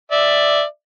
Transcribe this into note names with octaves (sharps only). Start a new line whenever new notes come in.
D5 E5